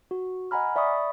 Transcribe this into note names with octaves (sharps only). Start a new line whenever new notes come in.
F#4
D#5 F#5 G#5 A#5 B5 F6
D5 E5 B5 C#6 D#6